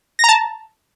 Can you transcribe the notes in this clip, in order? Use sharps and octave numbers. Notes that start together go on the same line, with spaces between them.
A5 A#5 A#6